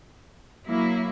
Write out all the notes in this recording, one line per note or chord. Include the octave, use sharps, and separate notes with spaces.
F#3 A#3 E4